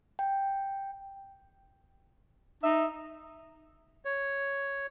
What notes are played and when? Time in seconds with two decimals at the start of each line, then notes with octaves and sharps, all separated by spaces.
0.19 G5
2.63 D#4 E5
4.05 C#5